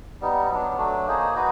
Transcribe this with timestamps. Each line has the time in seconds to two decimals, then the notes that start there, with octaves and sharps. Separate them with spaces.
0.21 G3 B3 D#4
0.49 F#3 B3 D4
0.78 F#3 A3 D4
1.07 A#3 D#4 G#4 C5
1.35 D#4 F#4 B4